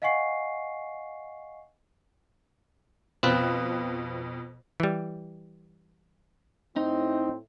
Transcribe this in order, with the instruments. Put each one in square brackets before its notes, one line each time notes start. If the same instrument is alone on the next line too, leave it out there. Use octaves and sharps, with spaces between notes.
[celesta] D#5 F5 F#5 G#5 C#6 C7
[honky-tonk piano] F2 B2 [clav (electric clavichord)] C4 F4 B4
[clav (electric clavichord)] E3 G3
[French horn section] A2 E4 [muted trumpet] C4 [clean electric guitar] D#4